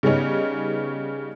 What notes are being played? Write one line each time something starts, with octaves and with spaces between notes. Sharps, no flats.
C#3 G3 B3 C#4 D#4